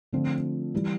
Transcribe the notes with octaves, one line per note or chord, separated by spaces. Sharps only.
D3 F3 A3 C4 F4
E3 G3